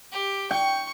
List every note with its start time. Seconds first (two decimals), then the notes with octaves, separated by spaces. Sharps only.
0.12 G4
0.51 G5 C#6